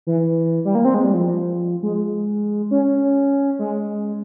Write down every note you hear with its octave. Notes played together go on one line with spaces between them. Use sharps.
E3
G3
A#3
C4
G#3
G3
F3
G#3
C#4
G#3